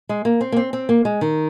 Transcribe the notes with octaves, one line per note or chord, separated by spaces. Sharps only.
G#3
A#3
C4
A#3
C4
C4
A#3
G#3
D#3